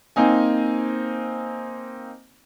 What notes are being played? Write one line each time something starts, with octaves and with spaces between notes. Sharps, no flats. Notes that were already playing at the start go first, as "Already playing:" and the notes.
A#3 C4 D#4 G#5